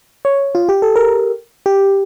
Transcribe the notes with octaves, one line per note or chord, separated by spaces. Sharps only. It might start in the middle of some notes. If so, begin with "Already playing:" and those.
C#5
F4
G4
A4
A#4
G4